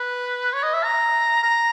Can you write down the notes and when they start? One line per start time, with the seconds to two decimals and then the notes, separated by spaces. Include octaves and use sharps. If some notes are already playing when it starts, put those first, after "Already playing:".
Already playing: B4
0.53 C#5
0.63 D#5
0.74 E5
0.84 A#5
1.43 A#5